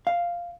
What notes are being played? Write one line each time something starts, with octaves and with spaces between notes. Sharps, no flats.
F5